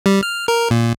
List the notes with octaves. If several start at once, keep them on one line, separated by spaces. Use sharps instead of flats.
G3
F6
A#4
A#2